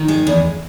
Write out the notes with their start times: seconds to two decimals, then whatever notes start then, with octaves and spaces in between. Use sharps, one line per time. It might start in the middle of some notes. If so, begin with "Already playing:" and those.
Already playing: D#3
0.08 G#3
0.27 E2